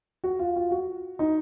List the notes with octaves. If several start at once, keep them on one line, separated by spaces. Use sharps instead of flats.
F#4
F4
F4
F#4
D#4